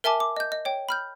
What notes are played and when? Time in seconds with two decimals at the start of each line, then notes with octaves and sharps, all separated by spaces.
0.04 A#4 E5 G#5 A5 D6
0.20 D6
0.37 D#5 G6
0.52 D#5
0.65 C#5 G5
0.89 B5 F6 G6